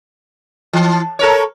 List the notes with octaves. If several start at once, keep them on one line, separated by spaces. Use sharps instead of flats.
E3
A4 A#4 C#5